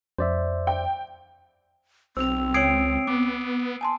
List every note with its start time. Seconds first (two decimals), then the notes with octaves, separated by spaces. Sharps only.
0.19 F2 C5 D5 E5
0.67 G5
2.17 B1 C4 C5 E6 F7
2.54 C#2 C#5 G5 D#6 G#6 C7 D7
3.07 B3 D6
3.81 G#5 A5 C6